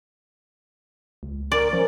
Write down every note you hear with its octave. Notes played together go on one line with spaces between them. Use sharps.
C#2
A#4 D5
F3 C#4